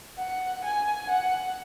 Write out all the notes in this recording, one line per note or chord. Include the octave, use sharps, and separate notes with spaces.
F#5
G#5
F#5